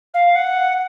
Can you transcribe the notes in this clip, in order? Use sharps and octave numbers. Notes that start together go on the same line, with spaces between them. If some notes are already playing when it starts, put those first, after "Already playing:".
F5
F#5